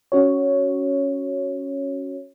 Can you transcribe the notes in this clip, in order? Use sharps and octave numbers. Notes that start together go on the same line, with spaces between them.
C#4 F#4 C#5